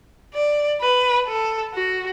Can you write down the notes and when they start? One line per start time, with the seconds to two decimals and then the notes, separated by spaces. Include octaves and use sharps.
0.34 D5
0.81 B4
1.28 A4
1.74 F#4